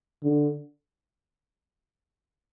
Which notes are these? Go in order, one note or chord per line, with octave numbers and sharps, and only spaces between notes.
D3